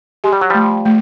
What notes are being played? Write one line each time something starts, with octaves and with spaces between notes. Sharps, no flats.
G#3 G4
G3
F#3
F3 G3 A3
A3